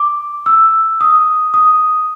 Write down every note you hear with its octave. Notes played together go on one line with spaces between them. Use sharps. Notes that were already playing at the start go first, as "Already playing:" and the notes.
Already playing: D6
E6
D#6
D#6